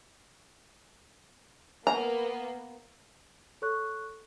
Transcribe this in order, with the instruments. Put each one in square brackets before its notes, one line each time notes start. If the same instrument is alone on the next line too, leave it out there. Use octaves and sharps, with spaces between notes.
[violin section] A#3 B3 [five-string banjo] A#5
[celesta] A4 C#5 C#6 F#6